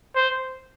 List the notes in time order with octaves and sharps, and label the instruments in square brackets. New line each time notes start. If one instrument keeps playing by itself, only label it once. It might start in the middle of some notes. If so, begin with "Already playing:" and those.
[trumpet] C5